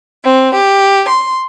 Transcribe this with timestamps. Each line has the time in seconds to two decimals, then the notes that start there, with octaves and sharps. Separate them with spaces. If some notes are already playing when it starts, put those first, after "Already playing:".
0.24 C4
0.55 G4
1.09 C6